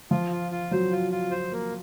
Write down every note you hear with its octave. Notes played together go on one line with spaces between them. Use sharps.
F3 F4
F4
F4
F#3 C5
F4
F4
C5
A#3